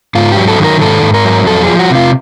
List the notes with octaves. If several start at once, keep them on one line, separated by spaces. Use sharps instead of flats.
G#2 F4
F#3 G4
A4
D#3
A#4
G#2 A4
G#2
A#4
F#3
F2 A4
F3 G#4
F#4
C3 F4